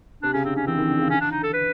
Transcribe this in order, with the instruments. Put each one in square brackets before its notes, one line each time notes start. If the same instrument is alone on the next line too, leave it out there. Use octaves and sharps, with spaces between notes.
[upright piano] C3 [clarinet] D4
[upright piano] C#3 [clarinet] C#4
[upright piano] D3 [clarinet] C4
[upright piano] D3 [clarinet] C#4
[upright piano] E3 [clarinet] C4
[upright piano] D#3
D3
C#3
[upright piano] D3 [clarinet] C#4
[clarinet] D4
D#4
A4
B4